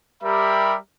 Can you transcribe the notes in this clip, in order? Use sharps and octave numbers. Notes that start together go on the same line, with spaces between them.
G3 G4 A#4 E5 B5